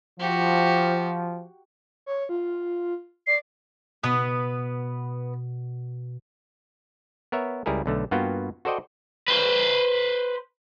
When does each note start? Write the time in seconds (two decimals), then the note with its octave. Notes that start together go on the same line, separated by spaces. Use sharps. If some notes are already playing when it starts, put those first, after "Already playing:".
0.20 F3 F#4 G4
2.06 C#5
2.29 F4
3.27 D5 C7
4.03 B2 B3 B4
7.32 B3 A#4 C#5 E5
7.66 C#2 G3 E4 G#4 A#4
7.86 B1 D3 A3
8.11 G2 A#3 B3 F4 F#4 G5
8.65 F#4 A4 C5 D5 D#5 G5
9.28 B4 C5